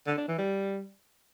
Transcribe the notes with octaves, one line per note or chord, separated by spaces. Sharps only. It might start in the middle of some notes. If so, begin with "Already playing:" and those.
D3
D4
E3
G3